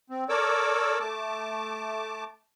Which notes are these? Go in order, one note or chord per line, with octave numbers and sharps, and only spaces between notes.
C4
A4 A#4 C#5 D5 D6 E6
A3 A5 D6